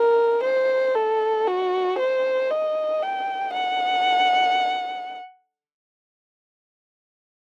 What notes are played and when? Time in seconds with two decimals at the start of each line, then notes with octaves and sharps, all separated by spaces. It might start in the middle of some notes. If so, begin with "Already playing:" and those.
Already playing: A#4
0.44 C5
0.95 A4
1.47 F#4
1.99 C5
2.50 D#5
3.02 G5
3.54 F#5